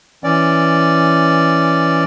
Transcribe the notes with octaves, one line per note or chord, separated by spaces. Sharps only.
E3 C#4 D5